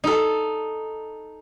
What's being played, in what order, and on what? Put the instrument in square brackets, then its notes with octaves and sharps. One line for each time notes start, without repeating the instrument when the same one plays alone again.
[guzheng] D#4 A4